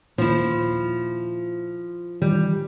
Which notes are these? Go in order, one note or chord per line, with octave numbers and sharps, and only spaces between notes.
D#2 A#2 F3 E4
D#3 E3 G3